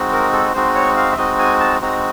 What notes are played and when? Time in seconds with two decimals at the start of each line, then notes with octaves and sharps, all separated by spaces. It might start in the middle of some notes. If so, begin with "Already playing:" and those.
Already playing: G#3 C4 D#4 F#4
0.13 A#4
0.33 A4
0.54 G#3 C4 D#4 F#4 C5
0.75 C#5
0.97 F5
1.12 E5
1.17 G#3 C4 D#4 F#4 D#5
1.39 G#5
1.60 A5
1.81 G#3 C4 D#4 F#4 A#5